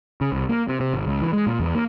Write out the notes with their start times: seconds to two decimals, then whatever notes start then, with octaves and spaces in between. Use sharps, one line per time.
0.21 C#3
0.32 C2
0.49 A#3
0.69 C3
0.80 C3
0.94 G#1
1.06 C#2
1.21 E3
1.33 G#3
1.47 A#2
1.60 E2
1.75 A#3